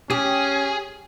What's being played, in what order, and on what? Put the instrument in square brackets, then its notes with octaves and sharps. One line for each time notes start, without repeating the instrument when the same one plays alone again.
[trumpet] C#4 [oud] G4 [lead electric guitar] G#4